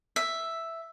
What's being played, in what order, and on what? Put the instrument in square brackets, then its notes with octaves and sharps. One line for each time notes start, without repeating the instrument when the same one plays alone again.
[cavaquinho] E5